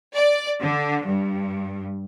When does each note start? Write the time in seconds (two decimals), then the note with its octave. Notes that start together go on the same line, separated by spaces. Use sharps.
0.15 D5
0.61 D3
1.03 G2